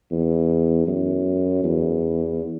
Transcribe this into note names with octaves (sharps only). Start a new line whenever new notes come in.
E2
F#2
E2